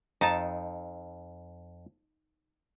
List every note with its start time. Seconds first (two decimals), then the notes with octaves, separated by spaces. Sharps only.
0.21 F2 D#4 A5